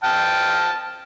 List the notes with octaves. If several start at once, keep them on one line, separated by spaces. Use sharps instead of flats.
G5 A5 F6